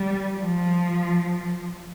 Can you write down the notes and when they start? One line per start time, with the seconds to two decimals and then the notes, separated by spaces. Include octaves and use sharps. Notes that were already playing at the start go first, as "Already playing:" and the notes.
Already playing: G3
0.38 F3